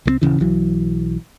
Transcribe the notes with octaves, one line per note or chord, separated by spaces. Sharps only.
C2 G3 C4
D#1 G#1 C#3 E3
B1 E3 F#3